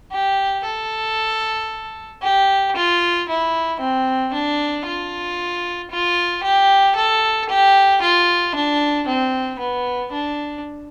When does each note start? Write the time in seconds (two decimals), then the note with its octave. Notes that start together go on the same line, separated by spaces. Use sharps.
0.12 G4
0.65 A4
2.22 G4
2.76 F4
3.28 E4
3.80 C4
4.33 D4
4.86 F4
5.91 F4
6.43 G4
6.96 A4
7.49 G4
8.02 F4
8.55 D4
9.07 C4
9.59 B3
10.12 D4